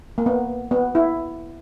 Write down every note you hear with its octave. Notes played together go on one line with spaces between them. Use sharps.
A#3
B3
B3
E4